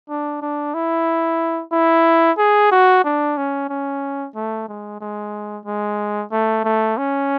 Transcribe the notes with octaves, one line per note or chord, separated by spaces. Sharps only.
D4
D4
E4
E4
G#4
F#4
D4
C#4
C#4
A3
G#3
G#3
G#3
A3
A3
C#4